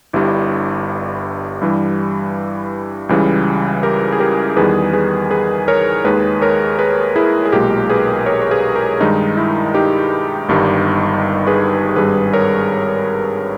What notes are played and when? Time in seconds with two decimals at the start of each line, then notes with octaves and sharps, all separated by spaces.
0.13 G1 G2 G3 E4
1.62 G2 E3 G3
3.09 C#2 C#3 E3 G3
3.83 G4 A#4
4.12 G#4
4.20 G4 A#4
4.56 E2 D#3 G3 G#4 B4
4.93 G#4 B4
5.31 G#4 B4
5.68 A#4 C#5
6.05 D#2 D#3 G#3 G#4 B4
6.42 A#4 C#5
6.79 G#4 B4
7.16 E4 G#4
7.45 G#4
7.52 B1 A#2 G#3 G4 A#4
7.90 G#4 B4
8.26 A#4 C#5
8.42 C#5
8.51 G#4 B4
8.76 G4 A#4
9.01 G2 D#3 G#3 D#4
9.37 E4
9.74 D#4 G4
10.49 G1 G2 D#3 G3
11.47 G#4 B4
11.96 G#1 G2 G3 G#4 B4
12.33 A#4 C#5